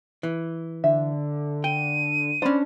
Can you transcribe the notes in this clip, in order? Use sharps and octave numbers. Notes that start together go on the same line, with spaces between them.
E3
D3 E5
G5 D#7
C#4 D4 C5 D5 B5